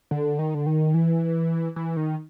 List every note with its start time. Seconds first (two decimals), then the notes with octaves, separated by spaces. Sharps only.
0.11 D3
0.39 D#3
0.54 D3
0.66 D#3
0.94 E3
1.76 E3
1.97 D#3